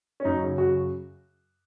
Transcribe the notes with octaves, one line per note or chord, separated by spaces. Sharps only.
C#4
F#2 D#4
C#3
F#2 F#4